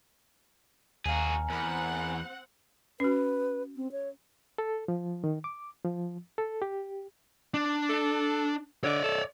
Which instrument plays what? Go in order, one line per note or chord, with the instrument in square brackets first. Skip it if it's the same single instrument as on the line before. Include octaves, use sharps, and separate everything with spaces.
[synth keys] D#2 F5 [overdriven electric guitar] F#4 G#4 [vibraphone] G#5 A#5
[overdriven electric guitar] E2 [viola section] C4 F#5 [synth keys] A#4 B5
[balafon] C#4 F#4 [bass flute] B4
[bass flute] C4
C#5
[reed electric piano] A4
F3
D#3
D6
F3
A4
G4
[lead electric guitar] D4
[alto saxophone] A4
[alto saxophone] D3 [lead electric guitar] C#5 D5
[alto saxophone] A4